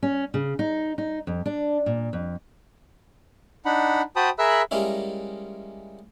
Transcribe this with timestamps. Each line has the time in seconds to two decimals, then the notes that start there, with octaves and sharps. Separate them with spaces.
0.03 C#4
0.34 C#3
0.59 D#4
0.98 D#4
1.27 F2
1.46 D4
1.86 A#2
2.13 F2
3.65 D4 D#4 F#5 B5
4.16 F#4 C5 G5 A5 B5 D#6
4.39 G#4 A#4 E5 B5 E6 F#6
4.71 G3 G#3 A#3 C#4 E4